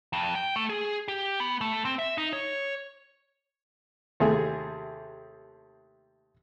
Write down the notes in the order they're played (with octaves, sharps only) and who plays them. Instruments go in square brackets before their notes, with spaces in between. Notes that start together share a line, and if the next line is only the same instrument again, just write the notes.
[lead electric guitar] F2
G5
A3
G#4
G4
B3
A3
C4
E5
D#4
C#5
[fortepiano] D#2 C3 A3 E4 G#4 A4